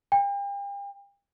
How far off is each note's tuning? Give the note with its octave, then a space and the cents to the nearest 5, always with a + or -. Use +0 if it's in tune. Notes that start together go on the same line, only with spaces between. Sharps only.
G5 +40